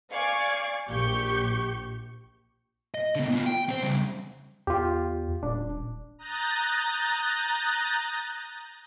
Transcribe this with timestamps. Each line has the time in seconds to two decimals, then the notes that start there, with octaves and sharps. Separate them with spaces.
0.12 D5 F5 G#5 C#6 D6 G#6
0.88 A#1 G4 C#6 G6
2.94 D#5
3.15 D3 B3
3.31 B3 F4
3.46 G5
3.69 C4 C5
3.83 C#3 G3
4.67 E2 F4 G4
5.43 D#1 D4
6.19 A#5 D#6 F#6 G6 A6 A#6